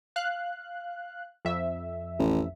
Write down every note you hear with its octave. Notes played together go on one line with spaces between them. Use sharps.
F5 F#6
F2 E5
A1